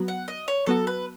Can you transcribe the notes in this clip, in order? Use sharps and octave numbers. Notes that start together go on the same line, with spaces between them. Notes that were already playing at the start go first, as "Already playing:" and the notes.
Already playing: F#3 B3 F#4
F#5
D#5
C#5
F#3 B3 F#4 A4
B4